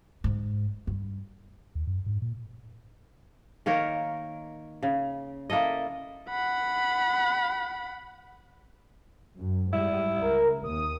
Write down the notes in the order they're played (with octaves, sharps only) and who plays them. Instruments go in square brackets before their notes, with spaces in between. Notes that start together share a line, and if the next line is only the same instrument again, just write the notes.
[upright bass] G#2
G2
[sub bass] D#2
F#2
G#2
A#2
[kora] D#3 A#3 A#4 C#5
C#3
A#3 E4 A4 D#5
[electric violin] F#5 B5
[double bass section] F#2
[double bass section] G#2 G3 [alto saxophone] E4
[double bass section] C#2 [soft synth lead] A#4
[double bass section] D#2 [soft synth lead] D#6